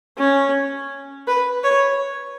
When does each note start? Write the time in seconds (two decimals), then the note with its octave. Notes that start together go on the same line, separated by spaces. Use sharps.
0.18 C#4
1.27 B4
1.63 C#5